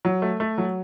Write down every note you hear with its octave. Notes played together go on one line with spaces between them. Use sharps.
F#3
A3
A3
F#3